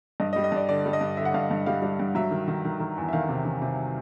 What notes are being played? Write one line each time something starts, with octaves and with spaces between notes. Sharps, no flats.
G2 D#5
D#5
G3
D#5
G2 D5
D3 D5
G3
D#5
G2
D3 E5
F#5
G2 F5
G2
G3 F5
G3
G2
F#3 E5
D#3
D#3
D#3
D#3
E2
E5
D#3 F5
C3
D#3
C3